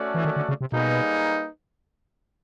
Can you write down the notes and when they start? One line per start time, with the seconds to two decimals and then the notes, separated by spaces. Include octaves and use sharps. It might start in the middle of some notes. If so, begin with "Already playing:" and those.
Already playing: A3 C#4 F#4 A4 D5
0.15 E3
0.25 D#3
0.36 D3
0.49 C#3
0.61 C3
0.72 B2 G3 A#3 D#4 G#4 B4